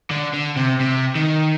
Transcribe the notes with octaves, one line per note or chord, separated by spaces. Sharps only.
D3
D3
C3
C3
D#3